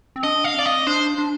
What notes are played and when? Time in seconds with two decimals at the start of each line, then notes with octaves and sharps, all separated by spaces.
0.16 C4
0.24 D4 D#5
0.44 F5
0.54 C4 D5
0.66 D#5
0.87 D4 C5
1.18 D4